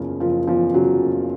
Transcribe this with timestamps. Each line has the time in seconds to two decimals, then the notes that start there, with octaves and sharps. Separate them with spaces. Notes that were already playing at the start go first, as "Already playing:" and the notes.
Already playing: F#1 E2 C#3 F3
0.20 F#1 F3
0.47 E2 F3
0.74 C#3 F#3
1.01 F#1